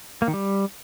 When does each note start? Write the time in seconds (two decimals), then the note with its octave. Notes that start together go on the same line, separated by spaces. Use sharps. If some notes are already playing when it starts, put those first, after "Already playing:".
0.22 A#3
0.28 D#3
0.34 G3